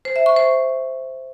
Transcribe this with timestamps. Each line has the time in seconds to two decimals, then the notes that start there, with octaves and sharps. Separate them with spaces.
0.05 C5
0.16 E5
0.26 C#6
0.37 C5